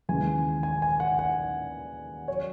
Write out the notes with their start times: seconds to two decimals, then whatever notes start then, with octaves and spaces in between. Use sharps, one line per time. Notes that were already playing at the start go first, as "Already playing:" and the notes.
0.09 D#2 C#3 E3 G#3 G#5
0.63 G#5
0.82 G#5
1.00 F#5
1.19 F#5
2.28 F#3 C#5